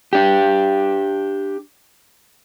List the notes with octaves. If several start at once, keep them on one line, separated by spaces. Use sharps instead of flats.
D4 G4